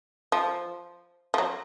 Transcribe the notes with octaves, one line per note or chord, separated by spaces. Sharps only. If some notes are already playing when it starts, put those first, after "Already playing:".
F3
F3
F#3